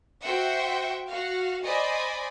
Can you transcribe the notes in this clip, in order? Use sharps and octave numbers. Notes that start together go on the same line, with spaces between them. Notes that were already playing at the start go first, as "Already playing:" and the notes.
F#4 C5 E5 F#5 G5
F#4 F5
C5 D5 D#5 G#5 B5